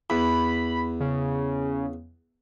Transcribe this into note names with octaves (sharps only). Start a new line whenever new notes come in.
E2 B5
C#3